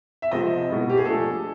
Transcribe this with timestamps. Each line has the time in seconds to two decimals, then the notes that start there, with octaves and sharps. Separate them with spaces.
0.22 E5
0.31 C3 F3 G#3 C4 D#5
0.69 B2 G#3 B3 E4
0.90 G4
0.97 G#4
1.05 F3 A3 D4 A4